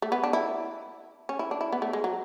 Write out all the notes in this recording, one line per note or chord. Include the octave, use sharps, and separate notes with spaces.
A3
B3
D4
E4
C#4
E4
D4
E4
B3
A3
G#3
F#3